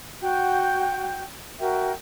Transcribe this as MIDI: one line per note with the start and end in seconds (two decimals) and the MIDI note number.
0.22 1.22 66
0.22 1.22 78
0.22 1.22 79
0.22 1.22 91
1.59 1.90 66
1.59 1.90 70
1.59 1.90 76
1.59 1.90 79